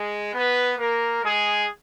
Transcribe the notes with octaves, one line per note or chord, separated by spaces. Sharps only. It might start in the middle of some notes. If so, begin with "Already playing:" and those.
Already playing: G#3 G#4
B3 B4
A#3 A#4
G#3 G#4